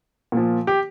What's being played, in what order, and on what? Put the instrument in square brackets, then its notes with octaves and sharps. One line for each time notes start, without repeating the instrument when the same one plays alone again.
[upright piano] A#2 F3
G4